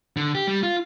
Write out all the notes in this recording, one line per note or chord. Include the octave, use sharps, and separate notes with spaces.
D3
G4
G3
F4